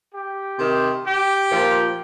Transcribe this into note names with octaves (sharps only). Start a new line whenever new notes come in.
G4
C3 D#3
G4
A#2 F3